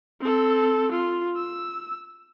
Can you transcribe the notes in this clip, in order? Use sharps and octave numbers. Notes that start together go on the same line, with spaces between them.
C4 A4
F4
E6